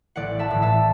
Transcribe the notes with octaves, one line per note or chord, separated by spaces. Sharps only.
A1 D5 F#5
E5 A5
A2 E3
E5 A5